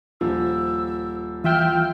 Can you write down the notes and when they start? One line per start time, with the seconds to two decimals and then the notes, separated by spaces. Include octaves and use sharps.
0.21 D#1 F3 E6
1.44 E3 F4 E5 G5 F6